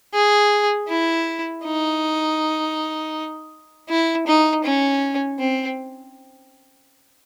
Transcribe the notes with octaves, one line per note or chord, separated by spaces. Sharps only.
G#4
E4
D#4
E4
D#4
C#4
C4